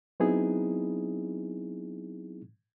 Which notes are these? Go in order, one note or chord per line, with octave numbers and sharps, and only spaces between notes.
F#3 B3 C4 D#4 E4 G#4